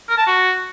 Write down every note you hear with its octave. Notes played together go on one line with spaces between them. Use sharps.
A#4
A5
F#4